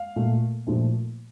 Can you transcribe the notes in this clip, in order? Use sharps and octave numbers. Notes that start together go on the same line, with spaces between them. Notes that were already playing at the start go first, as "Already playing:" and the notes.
Already playing: F5
A#2 A3
A#2 F3 A3